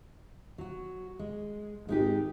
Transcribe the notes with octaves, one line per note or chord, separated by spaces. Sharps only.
F#3 F#4
G#3
G#1 G#3 D#4 G4